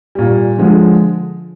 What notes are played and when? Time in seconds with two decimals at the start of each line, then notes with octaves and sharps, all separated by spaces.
0.15 A#2 G3
0.59 D3 F3 G#3